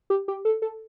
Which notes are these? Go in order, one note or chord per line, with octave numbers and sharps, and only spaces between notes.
G4
G4
A4
A4